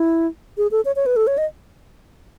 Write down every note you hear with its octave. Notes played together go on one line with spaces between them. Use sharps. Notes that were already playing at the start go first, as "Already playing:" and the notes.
Already playing: E4
G#4
A4
C#5
C#5
B4
A4
C#5
D#5